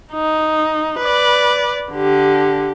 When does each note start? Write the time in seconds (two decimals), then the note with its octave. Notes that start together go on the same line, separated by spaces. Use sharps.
0.13 D#4
0.99 B4 D5
1.93 D3 G4